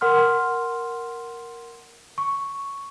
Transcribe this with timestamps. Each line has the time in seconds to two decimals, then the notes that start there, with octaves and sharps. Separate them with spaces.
0.01 A#4 F#5 C6 F6
2.18 C#6